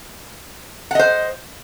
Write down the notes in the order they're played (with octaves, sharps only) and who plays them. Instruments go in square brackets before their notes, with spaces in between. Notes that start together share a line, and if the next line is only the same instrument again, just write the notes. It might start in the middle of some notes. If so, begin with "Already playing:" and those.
[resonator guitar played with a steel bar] F#5
D#5
C5